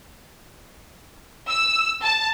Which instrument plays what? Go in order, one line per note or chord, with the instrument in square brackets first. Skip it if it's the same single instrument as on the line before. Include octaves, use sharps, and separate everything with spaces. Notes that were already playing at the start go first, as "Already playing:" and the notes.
[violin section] E6
A5